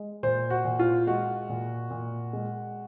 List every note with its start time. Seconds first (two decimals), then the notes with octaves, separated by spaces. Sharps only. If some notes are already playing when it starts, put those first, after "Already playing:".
Already playing: G#3
0.23 A#2 C5
0.50 F#4
0.65 A#2
0.79 F4
1.07 G#3 F#4
1.49 A#2
1.90 A#2
2.33 G#3